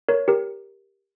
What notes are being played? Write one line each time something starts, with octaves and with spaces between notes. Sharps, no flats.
A#4 C#5
G4 A#4